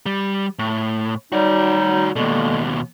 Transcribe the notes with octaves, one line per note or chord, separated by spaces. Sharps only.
G3
A2
F#3 G3 D#4 F#4 D5
D#2 B2 D3 G#3 A#3